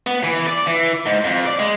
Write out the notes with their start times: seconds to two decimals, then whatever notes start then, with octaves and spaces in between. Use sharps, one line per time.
0.07 B3
0.24 E3
0.47 D5
0.67 E3
1.06 G#2
1.24 F2
1.46 D5
1.59 G#3